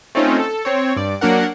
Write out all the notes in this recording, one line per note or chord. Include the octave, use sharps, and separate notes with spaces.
A3 C4 C#4 D#4 F4
A4
C4 C#5
G2 D5
F#3 A#3 D4 A#4 F#5